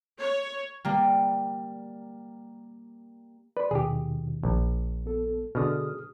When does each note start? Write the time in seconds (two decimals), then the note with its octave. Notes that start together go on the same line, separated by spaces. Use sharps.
0.19 C#5
0.85 G3 A#3
3.57 B4 D5 C6
3.71 D#2 B2 D#3 G4 G#4
4.43 A#1
5.06 B3 A4
5.55 B2 D3 G#4 D#6 F6